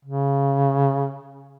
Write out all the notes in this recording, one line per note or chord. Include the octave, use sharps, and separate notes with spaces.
C#3